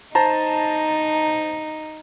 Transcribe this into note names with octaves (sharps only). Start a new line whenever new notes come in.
D#4 C5 A5 A#5